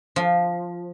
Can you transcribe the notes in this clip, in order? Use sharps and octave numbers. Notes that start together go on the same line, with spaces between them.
F3